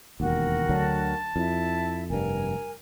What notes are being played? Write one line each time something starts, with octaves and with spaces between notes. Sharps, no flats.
E1 D#2 F#4 A#4 G5
D2 D3 F#3 A5
F2 E4
F1 G2 A#4 G#5